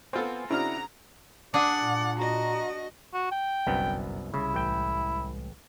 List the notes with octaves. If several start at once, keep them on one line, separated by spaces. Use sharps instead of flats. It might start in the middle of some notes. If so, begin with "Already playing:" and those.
B3 C4 F4 A4 C5 G#5
C#3 C4 D4 E4 F#4 A#5 F6
D4 G#4 D5 F#5
A#2
F#4 D#5 A#5
F#4
G5
G1 C2 F#2 B3
C2 C#3 G#3 E4
A1 G5